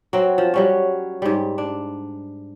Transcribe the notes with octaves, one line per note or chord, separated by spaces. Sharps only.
F#3 C4
F3
F#3 G3 C#4
G#2 G3
D4